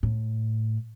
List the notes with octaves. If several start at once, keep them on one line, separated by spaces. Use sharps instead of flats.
A2